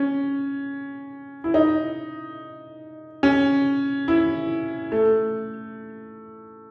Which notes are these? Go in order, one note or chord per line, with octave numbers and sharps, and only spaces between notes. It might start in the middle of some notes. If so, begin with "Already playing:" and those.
Already playing: C#4
E4
D#4
C#4
E4
A3